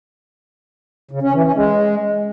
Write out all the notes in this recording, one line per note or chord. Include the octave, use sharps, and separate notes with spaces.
C#3
C#4
E3
C#4
G#3